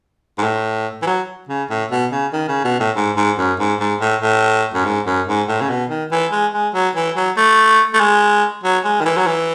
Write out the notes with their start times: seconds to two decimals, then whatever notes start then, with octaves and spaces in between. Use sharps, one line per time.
0.38 G#2
0.43 A2
1.02 E3
1.07 F#3
1.49 C#3
1.70 A2
1.91 B2
2.12 C#3
2.33 D#3
2.48 C#3
2.65 B2
2.80 A2
2.96 G#2
3.17 G#2
3.38 F#2
3.59 G#2
3.80 G#2
4.01 A2
4.21 A2
4.74 F#2
4.85 G#2
5.06 F#2
5.28 G#2
5.49 A2
5.61 C#3
5.70 B2
5.90 D#3
6.11 E3
6.32 G#3
6.54 G#3
6.74 F#3
6.96 E3
7.16 F#3
7.37 A3
7.94 A3
8.00 G#3
8.64 F#3
8.84 G#3
9.01 D#3
9.05 E3
9.17 F#3
9.27 E3